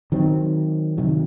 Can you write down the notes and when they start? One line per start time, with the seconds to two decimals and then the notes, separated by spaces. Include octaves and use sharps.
0.12 D#3 F#3 C4
0.98 C3 D#3 F#3